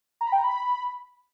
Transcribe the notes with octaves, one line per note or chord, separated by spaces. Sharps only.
A#5
B5
G5
A#5
B5